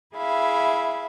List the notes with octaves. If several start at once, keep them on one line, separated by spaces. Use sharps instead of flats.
E4 G#4 E5 F5 B5